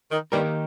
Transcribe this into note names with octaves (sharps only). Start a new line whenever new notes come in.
D#3
G2 D#3 G3 A#3 D#4 G4 A#4